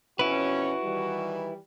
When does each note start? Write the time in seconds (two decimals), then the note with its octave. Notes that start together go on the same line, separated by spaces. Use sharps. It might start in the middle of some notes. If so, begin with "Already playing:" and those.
0.19 F2 B2 C#4 E4 F#4 B4
0.83 D#3 E3 G3